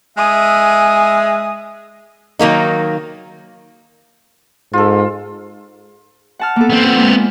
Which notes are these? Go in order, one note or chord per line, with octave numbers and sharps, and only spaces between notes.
G#3 E5 G#5 D#6
D#3 F#3 A#3 D#4
G#2 F4 A4
F#5 A5 F6
A#3 B3 A4
B3 C4 E6
F4 A4
G#3 A#3